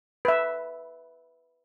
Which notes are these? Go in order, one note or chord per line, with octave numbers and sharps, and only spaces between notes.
B4 E5